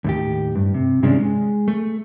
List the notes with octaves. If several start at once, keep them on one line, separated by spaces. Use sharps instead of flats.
D#2 A2 G4
G2
C3
G2 C3 D#3 G#3 C#4 D4
G#3
A3